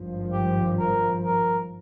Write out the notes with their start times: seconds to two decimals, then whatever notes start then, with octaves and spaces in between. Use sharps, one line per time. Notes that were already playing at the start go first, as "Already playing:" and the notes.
Already playing: G#1 G2 F3
0.32 G4
0.79 A#4
1.24 A#4